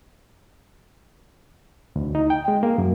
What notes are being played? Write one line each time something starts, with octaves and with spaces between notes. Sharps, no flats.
D2
D#4
G5
G#3
A#3
F#2